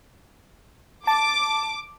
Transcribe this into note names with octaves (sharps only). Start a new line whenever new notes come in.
A5 D6